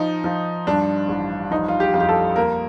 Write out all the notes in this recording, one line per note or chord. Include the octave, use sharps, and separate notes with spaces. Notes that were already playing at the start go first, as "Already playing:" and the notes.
Already playing: F3 D#4
F3
G2 D4
A1
F3 D#4
F4
G4
F2 F4
G4
A4
A#3 A#4